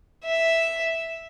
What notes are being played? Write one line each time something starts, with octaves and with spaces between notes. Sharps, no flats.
E5